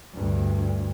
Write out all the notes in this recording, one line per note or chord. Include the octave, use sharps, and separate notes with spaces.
D2 G2